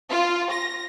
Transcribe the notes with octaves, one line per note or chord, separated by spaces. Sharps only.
F4
A#6